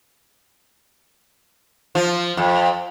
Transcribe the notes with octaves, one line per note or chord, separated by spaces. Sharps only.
F3
F2